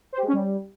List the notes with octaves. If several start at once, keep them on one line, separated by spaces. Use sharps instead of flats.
C5
G4
G#3
C#4
G3